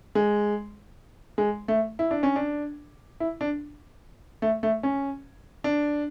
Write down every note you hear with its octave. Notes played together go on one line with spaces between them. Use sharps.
G#3
G#3
A3
E4
D4
C#4
D4
E4
D4
A3
A3
C#4
D4